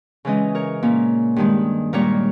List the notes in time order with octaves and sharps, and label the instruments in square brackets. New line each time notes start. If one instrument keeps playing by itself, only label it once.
[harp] C#3 E3 G#3 C#4 B4 D#5
A#4 C#5
A#2 A#3 C#4
G2 D#3 G#3
A#2 G3 A#3 A#4 C#5